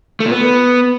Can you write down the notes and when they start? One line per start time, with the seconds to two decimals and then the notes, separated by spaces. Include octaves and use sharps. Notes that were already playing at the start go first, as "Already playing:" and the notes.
0.20 A3
0.26 A#2
0.31 B3